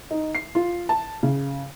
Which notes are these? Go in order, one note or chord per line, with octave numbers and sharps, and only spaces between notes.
D#4
C7
F4
A5
C#3